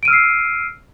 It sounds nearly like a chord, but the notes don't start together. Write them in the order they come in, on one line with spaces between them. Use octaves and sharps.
D7 D#7 F6 E6 C7